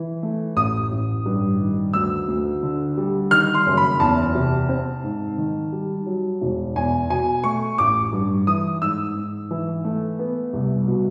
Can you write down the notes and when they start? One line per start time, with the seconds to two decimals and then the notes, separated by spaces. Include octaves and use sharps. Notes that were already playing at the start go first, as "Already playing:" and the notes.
Already playing: E3
0.23 A3
0.56 A1 D#6
0.91 A1
1.26 G2
1.60 D#3
1.93 D2 E6
2.28 D2
2.63 D3
2.97 G3
3.31 D#3 F6
3.54 C6
3.66 F#1
3.77 B5
4.00 E2 A5
4.35 C3
4.69 C4
5.03 G#2
5.38 D#3
5.72 G3
6.06 F#3
6.41 E1
6.76 E2 G#5
7.10 B2 G#5
7.44 A3 C#6
7.78 A1 D6
8.13 G2
8.47 E3 D#6
8.82 G#2 E6
9.15 G#2
9.51 E3
9.84 A3
10.19 B3
10.53 C2
10.87 B2